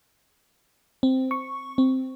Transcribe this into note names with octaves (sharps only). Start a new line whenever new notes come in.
C4
C#6
C4